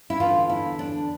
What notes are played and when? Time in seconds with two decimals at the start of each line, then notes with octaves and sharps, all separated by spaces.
0.10 E4
0.20 E2 D3 A3 F4
0.50 E4
0.79 D4